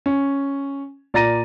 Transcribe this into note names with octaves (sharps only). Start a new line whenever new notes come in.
C#4
A#2 D5 A#5 A6 A#6 D#7